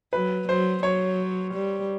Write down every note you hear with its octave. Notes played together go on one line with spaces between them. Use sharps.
F#3 B4
F#3 C5
F#3 C#5
G3